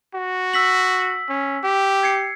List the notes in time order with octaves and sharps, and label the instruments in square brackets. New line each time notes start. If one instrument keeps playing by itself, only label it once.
[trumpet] F#4
[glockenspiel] E6 B6 F#7
[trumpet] C#4
G4
[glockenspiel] G#6 C7 C#7